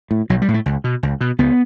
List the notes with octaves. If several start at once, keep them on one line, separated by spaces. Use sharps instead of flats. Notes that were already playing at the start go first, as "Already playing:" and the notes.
A2
B1 F#3
G3
A2
A3
C#2
B2
C#2
B2
C#2 B3